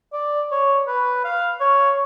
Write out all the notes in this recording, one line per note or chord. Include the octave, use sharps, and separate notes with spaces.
D5
C#5
B4
F5
C#5